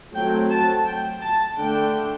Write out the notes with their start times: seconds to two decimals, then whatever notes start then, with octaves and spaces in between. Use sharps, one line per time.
0.14 F#3 A3 C4 G5
0.50 A5
0.85 G5
1.20 A5
1.56 D3 A3 D4 G5